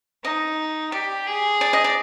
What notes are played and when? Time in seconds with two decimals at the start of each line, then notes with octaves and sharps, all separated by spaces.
0.24 D#4 D#5
0.92 G4 D5
1.26 G#4
1.61 D5
1.73 D#5
1.84 D5